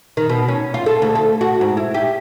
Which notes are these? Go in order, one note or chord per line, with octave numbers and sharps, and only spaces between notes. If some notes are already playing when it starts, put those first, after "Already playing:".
D#3
B2
C#4
F4
A4
D2
A4
F#4
G#2
E4
G4